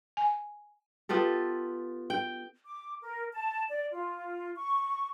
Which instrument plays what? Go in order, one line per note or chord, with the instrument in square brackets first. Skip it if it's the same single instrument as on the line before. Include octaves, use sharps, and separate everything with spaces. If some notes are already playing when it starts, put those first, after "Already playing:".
[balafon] G#5
[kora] B3 F4 G4 A4
G5
[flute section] D6
A#4
A5
D5
F4
C#6